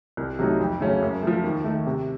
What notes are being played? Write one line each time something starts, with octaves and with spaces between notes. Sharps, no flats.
C2
C3 F#3 A3 D#4
F2
C#3 F#3 A3 C#4
F#2
F3 A3
D#2
D#3 A3
C3